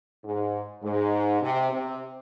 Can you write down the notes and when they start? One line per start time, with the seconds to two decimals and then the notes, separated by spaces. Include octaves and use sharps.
0.24 G#2
0.83 G#2
1.42 C3
1.72 C3